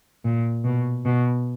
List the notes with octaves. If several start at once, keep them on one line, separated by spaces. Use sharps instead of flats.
A#2
B2
B2